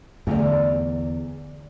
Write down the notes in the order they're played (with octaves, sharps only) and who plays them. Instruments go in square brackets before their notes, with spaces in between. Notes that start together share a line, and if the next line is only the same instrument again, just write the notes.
[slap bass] E2 [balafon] D3 A3 [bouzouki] D5 A#5